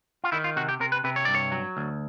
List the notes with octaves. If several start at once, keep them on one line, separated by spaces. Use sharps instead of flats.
F4
D#3 E4
F4
C3 F#4
G4
C3 A#4
B4
C3 B4
C#5
G2 D5
C#5
F#3
D2